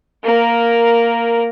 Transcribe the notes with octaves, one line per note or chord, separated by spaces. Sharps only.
A#3 A#4